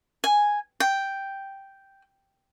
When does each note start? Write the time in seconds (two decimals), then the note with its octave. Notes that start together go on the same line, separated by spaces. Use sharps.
0.24 G#5
0.80 G5